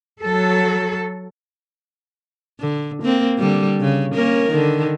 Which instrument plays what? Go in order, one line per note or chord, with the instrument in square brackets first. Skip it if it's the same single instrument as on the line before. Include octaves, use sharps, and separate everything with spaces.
[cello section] F#3 A4
[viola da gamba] D3
A#3 C4
D3 G3
C#3
A#3 C#4 A#4
D3 D#3